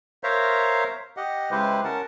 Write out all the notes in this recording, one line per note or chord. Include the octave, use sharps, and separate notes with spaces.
A#4 C5 C#5 E5 F5 A#5
G4 D#5 F#5
C#3 G#3 E4 G4 B4 C5
C#4 A#4 F#5 A5